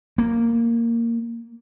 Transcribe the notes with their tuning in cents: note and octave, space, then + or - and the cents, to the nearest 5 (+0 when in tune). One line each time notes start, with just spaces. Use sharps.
A#3 -10